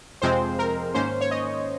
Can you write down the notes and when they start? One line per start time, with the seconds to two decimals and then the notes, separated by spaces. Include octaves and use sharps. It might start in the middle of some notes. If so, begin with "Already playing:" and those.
0.22 F2 C3 F3 G#3 C4 C5
0.59 A#4
0.94 G#2 D#3 A#3 C#4 C5
1.21 C#5
1.31 D#5